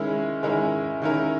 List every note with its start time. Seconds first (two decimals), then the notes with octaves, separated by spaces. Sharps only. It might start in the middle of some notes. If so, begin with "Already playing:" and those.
Already playing: D#3 G#3 C#4 E4 A#4
0.43 D#3 G#3 C#4 E4 A#4
1.02 D#3 G#3 C#4 E4 A#4